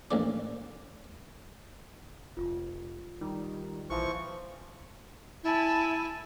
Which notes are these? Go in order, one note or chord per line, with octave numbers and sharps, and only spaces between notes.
A1 D#2 D4
F1 F4
D#3 G3
A#1 E3 F3 C#6
E4 G#5 A5 B5